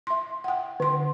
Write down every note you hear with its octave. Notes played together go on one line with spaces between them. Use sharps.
E5 C6
F#5 G5
D3 C6